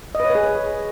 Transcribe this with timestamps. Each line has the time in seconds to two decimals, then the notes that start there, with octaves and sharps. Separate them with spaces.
0.15 D#5
0.20 B4
0.25 C#5
0.30 B4
0.35 G#4